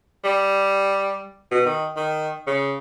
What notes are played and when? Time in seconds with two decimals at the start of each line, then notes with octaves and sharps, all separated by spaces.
0.24 G3
1.51 B2
1.66 D#3
1.97 D#3
2.47 C#3